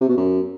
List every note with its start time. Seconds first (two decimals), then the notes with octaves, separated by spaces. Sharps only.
0.01 C3
0.09 B2
0.17 F#2